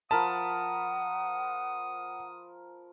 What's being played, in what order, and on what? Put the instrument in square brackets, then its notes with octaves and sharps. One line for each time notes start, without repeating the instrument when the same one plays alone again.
[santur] F3 A#4 B5 [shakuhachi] F#5 [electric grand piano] A5 [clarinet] D#6